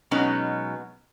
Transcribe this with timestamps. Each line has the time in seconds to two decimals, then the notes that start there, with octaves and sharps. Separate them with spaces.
0.11 B2 F#3 G#3 B3 C#4 D#4